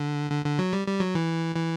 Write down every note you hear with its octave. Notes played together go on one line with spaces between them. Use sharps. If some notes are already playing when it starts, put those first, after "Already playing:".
Already playing: D3
D3
D3
F#3
G3
G3
F#3
E3
E3